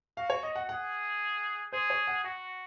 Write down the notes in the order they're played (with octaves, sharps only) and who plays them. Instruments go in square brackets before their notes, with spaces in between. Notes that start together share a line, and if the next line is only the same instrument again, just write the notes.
[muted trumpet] F#4 [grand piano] F5
[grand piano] C#5
D#5
F#5
[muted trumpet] G#4 [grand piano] F#5
[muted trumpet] G#4 [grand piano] C5
[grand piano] C#5
F#5
[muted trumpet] F#4 [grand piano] F#5